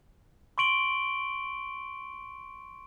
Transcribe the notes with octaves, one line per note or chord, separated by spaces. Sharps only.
C6 C#6 D7 F#7 G7